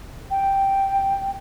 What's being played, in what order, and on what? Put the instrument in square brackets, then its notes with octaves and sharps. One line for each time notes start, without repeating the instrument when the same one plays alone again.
[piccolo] G5